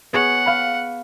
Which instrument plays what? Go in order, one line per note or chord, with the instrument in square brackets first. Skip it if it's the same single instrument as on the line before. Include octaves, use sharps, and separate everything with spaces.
[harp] B3 G#4 C#5 [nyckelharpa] F#5
[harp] F5 B5